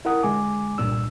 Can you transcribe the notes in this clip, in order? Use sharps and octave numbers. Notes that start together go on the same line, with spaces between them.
E4 A#4 F#5 D#6
D3 G#3 G#5 D6
C2 G2 A#2 D4 E6